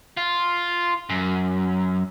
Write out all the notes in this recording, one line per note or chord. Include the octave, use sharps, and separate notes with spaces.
F4
F#2